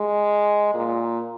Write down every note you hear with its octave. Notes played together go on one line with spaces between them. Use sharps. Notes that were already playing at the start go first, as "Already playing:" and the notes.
Already playing: G#3
A#2